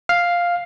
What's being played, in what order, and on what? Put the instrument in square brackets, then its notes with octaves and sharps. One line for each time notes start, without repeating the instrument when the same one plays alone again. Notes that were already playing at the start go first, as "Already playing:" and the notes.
[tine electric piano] F5